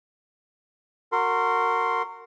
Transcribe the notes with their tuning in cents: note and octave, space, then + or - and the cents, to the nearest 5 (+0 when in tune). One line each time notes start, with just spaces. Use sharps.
F#4 -10 A#4 -25 C6 +0